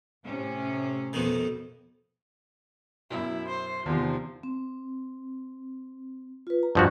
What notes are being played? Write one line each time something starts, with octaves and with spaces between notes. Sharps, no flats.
A2 C3 C#4
F2 B2 D#3
F#2 B2 E4
C5
E2 C3 D#3 F3
C4
F4 B4
A#5
G2 F3 F#4